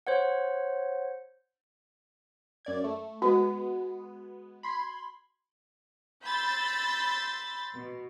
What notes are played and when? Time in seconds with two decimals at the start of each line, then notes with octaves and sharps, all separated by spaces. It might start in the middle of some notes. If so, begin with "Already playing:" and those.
0.07 C5 C#5 F#5
2.65 F#2 D5 G#6
2.84 A3
3.22 G#3 B3 F#4
4.63 B5 C6 G#6
6.25 B5 C6 E6 G6 A6 B6
7.73 B2